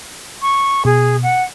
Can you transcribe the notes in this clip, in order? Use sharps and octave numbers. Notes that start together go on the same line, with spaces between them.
C#6
B2 G#4
F#5